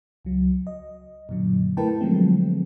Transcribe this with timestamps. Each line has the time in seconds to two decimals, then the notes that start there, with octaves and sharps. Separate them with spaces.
0.25 C#2 F#3
0.67 D#5
1.29 F#2 A#2 D3 F#3
1.77 A3 E4 A#4 B4 G5 A5
2.01 D3 F3 F#3 G#3 A3 C4